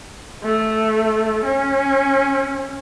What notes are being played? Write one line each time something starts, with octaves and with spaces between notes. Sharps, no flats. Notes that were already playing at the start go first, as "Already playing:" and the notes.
A3
C#4